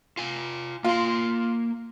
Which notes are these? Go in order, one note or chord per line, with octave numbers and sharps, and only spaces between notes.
F4 G#5
A#3 F4 C6